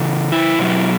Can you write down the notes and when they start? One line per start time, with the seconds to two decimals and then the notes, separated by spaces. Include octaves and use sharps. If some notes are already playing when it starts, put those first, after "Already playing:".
Already playing: C#3 E3
0.32 E4
0.59 B2 F#3